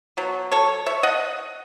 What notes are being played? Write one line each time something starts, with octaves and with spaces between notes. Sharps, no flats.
B2 F#3
A4 C#5
C#5 E5
D#5 F#5